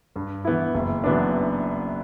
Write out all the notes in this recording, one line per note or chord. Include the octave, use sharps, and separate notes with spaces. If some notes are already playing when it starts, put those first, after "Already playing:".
G2
E3 B3 E4
F#1
F#2 E3 B3 D4